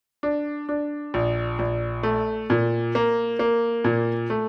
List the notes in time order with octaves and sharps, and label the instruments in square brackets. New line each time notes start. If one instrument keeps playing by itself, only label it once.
[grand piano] D4
D4
A#1
A#1
A3
A#2
A#3
A#3
A#2
A3